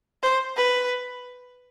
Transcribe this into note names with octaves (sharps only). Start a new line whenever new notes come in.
C5
B4